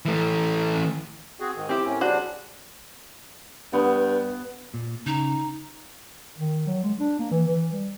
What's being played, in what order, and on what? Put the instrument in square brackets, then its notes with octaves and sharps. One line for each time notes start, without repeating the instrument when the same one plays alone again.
[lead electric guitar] E3 A3
[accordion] C4 F#4 G#4
G#2 D#3
[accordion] C3 G4 [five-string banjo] C4 E4
[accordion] A2 A#3 C#4
[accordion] C#3 G3 D4 [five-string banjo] F#4 C5
[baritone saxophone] G2 [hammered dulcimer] B3
[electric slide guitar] A#2
[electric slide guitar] C#3 [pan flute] D#4
[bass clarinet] D#3
F#3
G#3
D4
A#3
E3
E3
G3